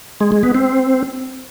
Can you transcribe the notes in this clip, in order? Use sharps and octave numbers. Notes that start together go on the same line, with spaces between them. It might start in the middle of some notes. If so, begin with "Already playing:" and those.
G#3
G#3
B3
C4